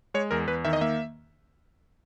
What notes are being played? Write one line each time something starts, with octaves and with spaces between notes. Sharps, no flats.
G#3 C#5
E2 A#4
E2 B4
D#3 E5
D#5
A#3 E5